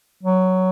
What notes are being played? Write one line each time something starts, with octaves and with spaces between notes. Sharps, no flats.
F#3